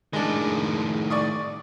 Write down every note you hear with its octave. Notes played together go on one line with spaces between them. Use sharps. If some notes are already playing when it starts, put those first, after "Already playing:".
A2 D#3 G#3 D4
D5 C#6 D#6